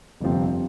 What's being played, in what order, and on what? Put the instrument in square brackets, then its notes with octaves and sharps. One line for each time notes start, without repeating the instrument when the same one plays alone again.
[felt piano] G1 F2 C3 F3 C4